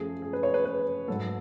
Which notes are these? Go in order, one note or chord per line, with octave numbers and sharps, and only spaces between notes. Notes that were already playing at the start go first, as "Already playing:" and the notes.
Already playing: F#2 F3 A3 G#4
G#4
B4
C#5
B4
B4
G#2 F#3 A3 A4